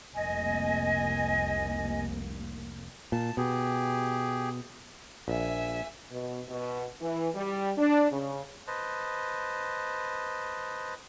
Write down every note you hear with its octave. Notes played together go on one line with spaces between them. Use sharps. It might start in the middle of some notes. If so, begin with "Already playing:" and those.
F1 C2 A#3 D#5 G#5
A#2 A5
B2 G4 G#4
A#1 E5 G#5
B2
B2
E3
G3
D4
C#3
B4 C5 D#5 A5